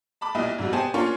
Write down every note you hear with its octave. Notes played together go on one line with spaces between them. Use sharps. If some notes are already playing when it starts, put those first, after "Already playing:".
A5 B5 D6
B1 A#2 G3 E4 D#5
G#2 C3 F#3 G3
B3 G4 C5 G#5 A5
A#3 C#4 D4 F4 C#5 C6